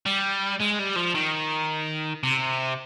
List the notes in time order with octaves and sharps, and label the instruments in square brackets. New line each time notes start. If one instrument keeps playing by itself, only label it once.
[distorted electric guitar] G3
G#3
G3
F3
D#3
C3